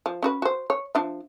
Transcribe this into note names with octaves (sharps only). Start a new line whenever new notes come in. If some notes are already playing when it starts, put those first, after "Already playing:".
F3
C#4 F#4 B4
F#4 C5
C#5
F3 D4 E5